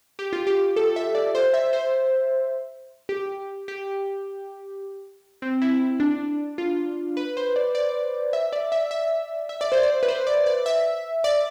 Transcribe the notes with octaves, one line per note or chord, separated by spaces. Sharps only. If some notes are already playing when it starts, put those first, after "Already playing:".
G4
F4
G4
A4
E5
D5
C5
E5
C5
G4
G4
C4
E4
D4
F4
B4
C5
D5
D5
E5
D5
E5
E5
E5
D5
C5
D5
B4
C5
D5
D5
E5
D5